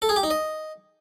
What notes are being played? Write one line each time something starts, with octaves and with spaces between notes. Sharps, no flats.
A4
G#4
G4
D#4
D#5